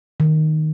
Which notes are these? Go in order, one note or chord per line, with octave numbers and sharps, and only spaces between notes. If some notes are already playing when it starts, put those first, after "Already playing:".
D#3